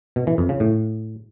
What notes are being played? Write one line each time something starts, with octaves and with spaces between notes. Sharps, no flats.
B2
E3
F2
C#3
A2